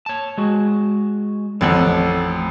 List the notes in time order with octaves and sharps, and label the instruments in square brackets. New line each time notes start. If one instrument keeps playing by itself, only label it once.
[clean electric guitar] C#5 A5
G#3 F#4
[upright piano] A1 F2 [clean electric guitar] A3 A4 F#5